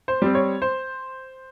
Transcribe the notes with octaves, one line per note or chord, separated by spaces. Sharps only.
C5
G3 C4
C#5
C5